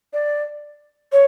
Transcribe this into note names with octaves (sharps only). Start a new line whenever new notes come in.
D5
C#5